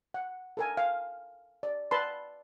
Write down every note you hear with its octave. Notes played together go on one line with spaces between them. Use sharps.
F#5
A4 A#4 G#5
F5
D5
B4 D5 A5 B5 C6